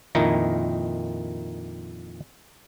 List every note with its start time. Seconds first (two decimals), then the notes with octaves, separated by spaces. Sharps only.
0.15 F2 A#2 D#3 D#4 E4